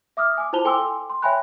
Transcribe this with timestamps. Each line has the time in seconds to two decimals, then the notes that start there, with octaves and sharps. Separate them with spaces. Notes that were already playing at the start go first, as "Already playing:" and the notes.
0.17 E5 D6 D#6 F6
0.38 G#5 D6
0.53 E4 F4 C5 A5 F7 G7
0.65 A4 G5 G#5 C6 D6 E6
1.10 C6
1.22 C#5 E5 G5 G#5 B5 F#6